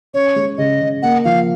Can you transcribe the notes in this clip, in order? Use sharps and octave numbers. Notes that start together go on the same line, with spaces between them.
C#4 C#5
G#3
C#3 D#5
C#3
A#3 F#5
F3 F5